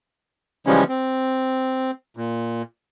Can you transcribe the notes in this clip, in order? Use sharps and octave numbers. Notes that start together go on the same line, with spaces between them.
C#3 E3 F3 G3 G#3 C#4
C4
A#2